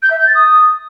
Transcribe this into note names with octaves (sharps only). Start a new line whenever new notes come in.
G6
E5
G6
A6
D#6